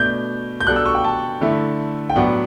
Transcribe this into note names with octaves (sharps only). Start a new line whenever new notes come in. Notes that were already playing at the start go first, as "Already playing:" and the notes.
Already playing: B2 A3 D4 G6
G6
B2 G3 D4 F#4 A4 F#6
E6
C#6
G5
A5
D3 A3 E4 A4
G5
A2 F#3 B3 D4 F#5